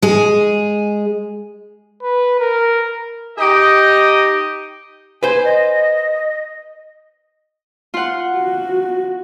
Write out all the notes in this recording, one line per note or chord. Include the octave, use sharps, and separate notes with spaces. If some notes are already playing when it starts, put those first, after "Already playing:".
G#3 G#4
B4
A#4
D#4 G4 D#5
B4 C5 G#5
D#5
F4 F#5
F#4